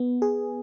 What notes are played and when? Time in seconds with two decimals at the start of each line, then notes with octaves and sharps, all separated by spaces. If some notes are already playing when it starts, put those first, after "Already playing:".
Already playing: B3
0.22 G#4